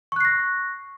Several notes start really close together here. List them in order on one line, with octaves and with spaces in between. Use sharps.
C#6 F#6 C7 A#6